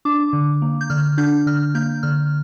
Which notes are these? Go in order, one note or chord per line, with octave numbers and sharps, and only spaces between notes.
D4 D6
D3
A#3
G6
D3 F6
D4 G6
D3 F6
A#3 G6
D3 F6